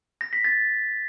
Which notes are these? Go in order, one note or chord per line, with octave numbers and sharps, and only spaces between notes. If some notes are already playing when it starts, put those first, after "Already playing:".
A#6
B6
A6